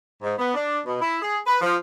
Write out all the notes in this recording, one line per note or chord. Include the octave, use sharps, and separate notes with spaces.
G#2
B3
D4
B2
E4
G#4
B4
F3